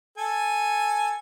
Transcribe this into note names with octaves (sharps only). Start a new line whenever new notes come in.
A4 G#5